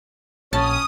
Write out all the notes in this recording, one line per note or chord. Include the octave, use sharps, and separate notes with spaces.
A#1 C#4 A5 D#6